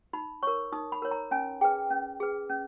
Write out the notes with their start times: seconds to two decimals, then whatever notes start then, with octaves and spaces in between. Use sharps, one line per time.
0.13 D#4 B5
0.43 A#4 C#5 C#6
0.72 D#4 D#6
0.92 B5
1.02 A#4 C#5
1.11 A#5
1.31 C#4 G#5
1.61 G#4 B4 G5
1.91 C#4
2.20 G#4 B4
2.50 C#4